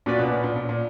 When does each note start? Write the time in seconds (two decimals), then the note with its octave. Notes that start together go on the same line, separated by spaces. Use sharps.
0.06 A#2 A#3 C#4 F#4 B4 D5
0.19 B2
0.31 A#2
0.44 A#2
0.56 A#2
0.69 A#2